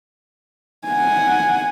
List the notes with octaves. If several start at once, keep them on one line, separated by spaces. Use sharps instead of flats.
F#5 G#5